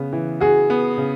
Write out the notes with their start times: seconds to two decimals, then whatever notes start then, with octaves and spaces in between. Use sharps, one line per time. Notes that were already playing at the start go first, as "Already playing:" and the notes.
Already playing: C#3 B3
0.13 E3
0.40 F#4 G#4
0.70 B3
0.98 C#3